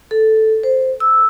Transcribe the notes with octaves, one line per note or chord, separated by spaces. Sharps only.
A4
C5
E6